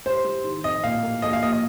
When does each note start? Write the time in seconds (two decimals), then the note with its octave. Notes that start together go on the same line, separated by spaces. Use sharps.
0.05 G3 C5
0.24 G3
0.44 D#3
0.64 F2 D#5
0.84 A#2 F5
1.03 A#3
1.22 A#1 D#5
1.33 F5
1.42 A#3 D#5
1.52 D#5